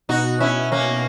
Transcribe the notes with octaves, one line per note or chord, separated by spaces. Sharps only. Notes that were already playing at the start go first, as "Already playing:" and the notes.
B2 D#4 F#4
C#4 E4
A#3 C#4